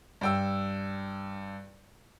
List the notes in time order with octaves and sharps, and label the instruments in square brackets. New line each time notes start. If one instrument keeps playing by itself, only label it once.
[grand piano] G2 G5 E6